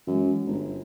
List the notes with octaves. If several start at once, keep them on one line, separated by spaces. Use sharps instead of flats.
F#2 E3 G#3
G1